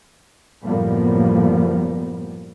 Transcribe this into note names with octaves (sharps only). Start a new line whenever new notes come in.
F#1 A2 F3 G3 A#3 B3